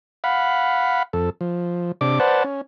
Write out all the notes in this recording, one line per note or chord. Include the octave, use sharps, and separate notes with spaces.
F5 F#5 B5
F2 A4
F3
C3 D4 D6
B4 C5 D5 F#5 A5
C#4